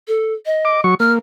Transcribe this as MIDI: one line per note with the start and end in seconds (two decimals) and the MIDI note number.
0.08 0.33 69
0.46 0.79 75
0.65 0.81 86
0.84 0.95 54
0.84 0.95 85
1.00 1.19 58
1.00 1.12 89